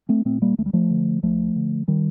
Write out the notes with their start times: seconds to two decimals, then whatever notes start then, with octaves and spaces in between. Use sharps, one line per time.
0.09 A3 C4
0.25 A#2 A3 C4
0.42 G3 A#3
0.58 D2 A3
0.66 G3
0.73 F3 A3
0.90 D3
1.23 D2 F3 A3
1.56 D3
1.88 D#3 G3